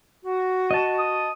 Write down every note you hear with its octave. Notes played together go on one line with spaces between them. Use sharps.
F#4
D#5 A5
D#6